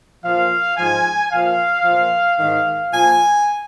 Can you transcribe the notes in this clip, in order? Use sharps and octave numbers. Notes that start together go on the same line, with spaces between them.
A#2 F3 F5
G#2 F3 G#5
A#2 F3 F5
A#2 F3
G#2 D#3
A#2 F3 G#5